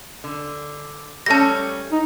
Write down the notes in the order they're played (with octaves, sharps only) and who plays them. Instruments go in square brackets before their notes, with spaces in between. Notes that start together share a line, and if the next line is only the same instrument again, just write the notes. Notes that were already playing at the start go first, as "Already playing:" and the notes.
[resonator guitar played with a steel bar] D3
[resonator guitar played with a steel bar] G3 A3 C#4 [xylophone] A5 A#6
[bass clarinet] D#4